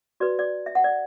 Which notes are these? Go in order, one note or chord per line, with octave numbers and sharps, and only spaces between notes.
F#4 B4 D5
D5
E5
F#5
D5